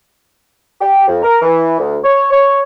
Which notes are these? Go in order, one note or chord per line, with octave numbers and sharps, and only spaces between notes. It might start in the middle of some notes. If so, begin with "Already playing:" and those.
G4
F2
A#4
E3
D2
C#5
C#5